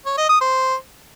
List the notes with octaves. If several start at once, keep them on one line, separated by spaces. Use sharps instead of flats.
C#5
D#5
D#6
C5